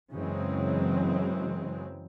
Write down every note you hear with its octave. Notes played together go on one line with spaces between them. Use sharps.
F#2 C#3 E3 F#3 G#3 C4